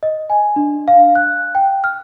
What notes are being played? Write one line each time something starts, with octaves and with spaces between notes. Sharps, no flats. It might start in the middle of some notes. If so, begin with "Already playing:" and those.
D#5
G#5
D4
F5
F#6
G5
F6